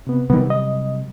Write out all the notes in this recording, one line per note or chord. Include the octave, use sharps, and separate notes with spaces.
C3 B3
C3 D#3 F#3 G3 B3
D#5